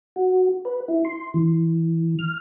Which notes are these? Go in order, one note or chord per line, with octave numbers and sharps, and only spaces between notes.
F#4
B4
E4
C6
E3
F6